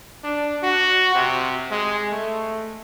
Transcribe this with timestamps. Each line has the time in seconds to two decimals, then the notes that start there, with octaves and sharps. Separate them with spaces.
0.24 D4
0.63 F#4
1.15 C3
1.71 G#3
2.11 A3